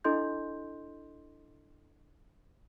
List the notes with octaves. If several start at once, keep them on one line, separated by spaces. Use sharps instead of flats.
D4 E4 A4 D#5 C6 G6